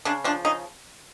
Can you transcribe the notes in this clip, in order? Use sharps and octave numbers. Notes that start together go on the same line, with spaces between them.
C#3 D4
F3 D4
C#3 D#4